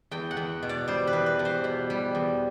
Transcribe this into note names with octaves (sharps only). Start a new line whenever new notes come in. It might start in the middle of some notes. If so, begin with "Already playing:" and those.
E2 G5
F#5
E2
B2
D5
G3 C5
B4
E2
B4
E2
C5
B2
G3
E2